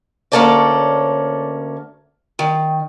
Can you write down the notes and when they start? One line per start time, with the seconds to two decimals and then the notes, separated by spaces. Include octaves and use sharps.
0.32 D2 A#3 C#4 A4 C#5 D5
2.39 D#3